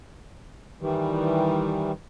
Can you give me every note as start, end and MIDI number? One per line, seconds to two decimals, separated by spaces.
0.81 1.92 51
0.81 1.92 52
0.81 1.92 55